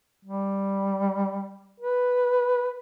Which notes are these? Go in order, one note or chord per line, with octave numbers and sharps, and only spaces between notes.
G3
B4